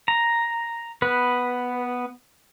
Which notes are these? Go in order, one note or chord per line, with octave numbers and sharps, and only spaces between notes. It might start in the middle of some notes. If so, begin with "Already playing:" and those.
A#5
B3 B4